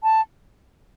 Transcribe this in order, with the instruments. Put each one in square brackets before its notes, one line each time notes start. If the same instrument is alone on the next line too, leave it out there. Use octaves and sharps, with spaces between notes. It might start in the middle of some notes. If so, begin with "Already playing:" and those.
[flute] A5